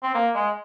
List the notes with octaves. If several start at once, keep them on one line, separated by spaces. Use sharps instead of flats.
C4
A#3
G#3